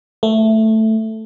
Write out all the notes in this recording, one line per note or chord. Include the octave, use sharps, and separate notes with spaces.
A3